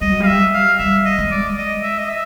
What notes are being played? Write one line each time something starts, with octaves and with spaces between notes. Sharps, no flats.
G3 D#5
F#3
G3 F5
E5
F5
G3 E5
D#5
G#3
D5
D#5
E5
D#5
E5